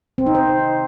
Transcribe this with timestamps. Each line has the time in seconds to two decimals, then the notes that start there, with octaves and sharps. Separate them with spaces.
0.18 C4
0.26 D#4
0.35 C5